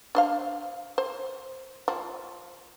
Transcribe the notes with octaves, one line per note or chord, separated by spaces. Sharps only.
D4 C5 F5
C5
F3